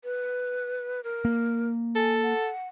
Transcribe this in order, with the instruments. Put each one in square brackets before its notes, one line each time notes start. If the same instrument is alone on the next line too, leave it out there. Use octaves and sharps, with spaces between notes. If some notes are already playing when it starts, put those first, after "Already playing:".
[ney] B4
A#4
[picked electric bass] A#3
[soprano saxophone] A4 [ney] G#5
[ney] F#5